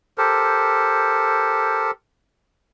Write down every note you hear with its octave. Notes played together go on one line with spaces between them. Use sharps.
G4 A4 A#4 C5